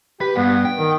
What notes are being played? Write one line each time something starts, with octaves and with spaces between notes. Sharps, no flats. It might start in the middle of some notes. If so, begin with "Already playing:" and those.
G4 B4
G2 B3
G5
D#3